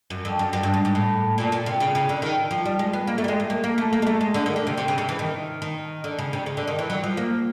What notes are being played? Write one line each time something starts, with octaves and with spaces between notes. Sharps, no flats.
F#2
F2
F#2
F#2
G2
G#2
G#2
A2
A#2
A#2
C3
C#3
C#3
D3
D#3
F3
G3
G#3
B3
A#3
A3
G3
G#3
A3
A#3
A#3
A3
A#3
G#3
A3
G#3
D3
D#3
D3
C3
C3
C#3
C3
E3
D#3
D#3
D3
C#3
C3
C#3
D3
D#3
E3
F#3
F3
A#3